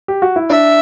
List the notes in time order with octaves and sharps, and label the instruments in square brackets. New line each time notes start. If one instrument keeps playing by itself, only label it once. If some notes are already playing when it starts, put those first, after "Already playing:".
[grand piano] G4
F#4
E4
[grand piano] D4 [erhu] E5